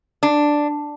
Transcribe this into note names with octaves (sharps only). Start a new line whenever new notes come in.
D4